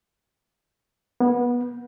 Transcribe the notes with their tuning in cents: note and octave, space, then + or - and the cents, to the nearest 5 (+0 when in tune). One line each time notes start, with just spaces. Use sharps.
B3 -20